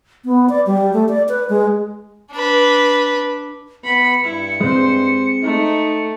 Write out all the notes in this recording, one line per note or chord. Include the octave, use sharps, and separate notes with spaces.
B3
D5
G3
A3
D5
B4
G#3
D4 B4
B3 B5 C#7
G2 E4
G#3 C4 C5
A3 D#4